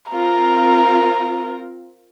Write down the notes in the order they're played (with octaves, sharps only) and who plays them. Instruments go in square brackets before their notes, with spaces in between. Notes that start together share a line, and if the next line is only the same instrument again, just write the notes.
[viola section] C4 F4 A#4 [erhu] A#5